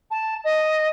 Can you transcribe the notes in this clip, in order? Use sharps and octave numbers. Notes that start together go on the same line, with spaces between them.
A5
D#5